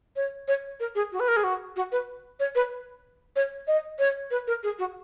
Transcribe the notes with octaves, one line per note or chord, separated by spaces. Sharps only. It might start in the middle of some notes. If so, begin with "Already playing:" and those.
C#5
C#5
A#4
G#4
F#4
B4
A#4
G#4
F#4
F#4
B4
C#5
B4
C#5
D#5
C#5
B4
A#4
G#4
F#4